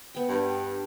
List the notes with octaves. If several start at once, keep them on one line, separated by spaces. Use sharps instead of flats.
B3 G5
G2